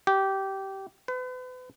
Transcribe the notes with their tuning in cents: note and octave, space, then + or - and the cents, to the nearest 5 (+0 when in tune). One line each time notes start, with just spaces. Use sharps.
G4 -20
B4 +40